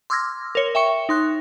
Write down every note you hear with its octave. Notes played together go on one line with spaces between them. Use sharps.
C6 D6 E6 F6 G#6 A#6
A#4 C#5
E5 G5 C#6 C#7
D#4 C6 F#6